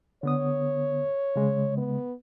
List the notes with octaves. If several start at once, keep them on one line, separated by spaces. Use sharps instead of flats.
D3 B3 C#5 D#6
C#3 G#3
B3